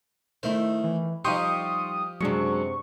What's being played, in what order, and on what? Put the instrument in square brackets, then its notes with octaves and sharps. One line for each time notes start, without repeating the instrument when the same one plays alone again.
[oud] D#3 E4 [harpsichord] A3 C5
[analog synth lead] E3
[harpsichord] F3 G4 [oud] G3 D#4 [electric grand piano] C6 C#6 G6 [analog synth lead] D#6
[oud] F#2 C3 [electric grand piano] F#3 G#3 D4 [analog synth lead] C#6